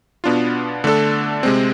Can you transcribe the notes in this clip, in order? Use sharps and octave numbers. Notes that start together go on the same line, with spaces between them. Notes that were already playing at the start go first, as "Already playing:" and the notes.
B2 B3 D4 F4
D3 A3 D4 A4
C3 G#3 C4